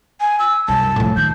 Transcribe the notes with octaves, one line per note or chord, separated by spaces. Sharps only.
G#5
E6
C2 F#2 A5
A2 F3
D#3 G6